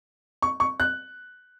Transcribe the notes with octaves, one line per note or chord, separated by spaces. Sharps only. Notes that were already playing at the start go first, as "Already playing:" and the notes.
C#6
C#6
F#6